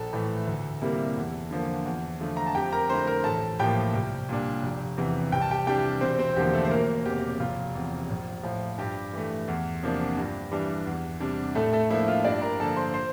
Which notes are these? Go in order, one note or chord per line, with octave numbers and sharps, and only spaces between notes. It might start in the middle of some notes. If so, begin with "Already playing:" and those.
Already playing: A#1 A4 A5
A2 E3 A3
D2
C3 G3 A#3 E4
E2
D3 F3 A#3
E2
D3 F3 A3
A#5
A5
F2 G4 G5
A#4 A#5
D3 A3 E4 C5 C6
A#4 A#5
A1 A4 A5
A2 F3 A#3 G4 G5
C2
A#2 G3 D4
F1
E2 C3 E3
C2 G5
A5
G4 G5
C3 E3 G3 D4 G4 G5
E1 C4 C5
C4 C5
E2 D3 F3 A#3 G4
A3 A4
C5
E1 A#3 A#4
E2 C3 G4
F1 F4
E2 C3
A#1
A2 F3
G2 G4
E3 A3
E2
C3 F3 A#3 D4
G2
E3 G3 D4
E2
C3 G3 D4
A2 A3 A4
A3 A4
F3 A#3 D4 E4 E5
F4 F5
G2 D4 D5
A#4 A#5
D3 F3 A#3 A4 A5
C5 C6
C5 C6